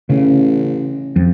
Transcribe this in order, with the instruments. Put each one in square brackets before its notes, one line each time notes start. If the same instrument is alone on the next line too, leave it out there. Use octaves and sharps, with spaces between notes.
[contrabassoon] A1 [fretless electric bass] C#3
[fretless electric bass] F2